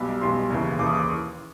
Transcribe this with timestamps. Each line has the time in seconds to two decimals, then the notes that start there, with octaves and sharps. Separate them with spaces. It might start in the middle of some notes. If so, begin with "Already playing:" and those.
Already playing: B1 B2 G3 B5
0.21 B1 B2 G3 C6
0.50 D#2 C#3 E3
0.79 D#2 C#3 E3 D6
0.87 D#6
0.95 D6